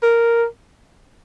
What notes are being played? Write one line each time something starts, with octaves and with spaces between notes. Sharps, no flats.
A#4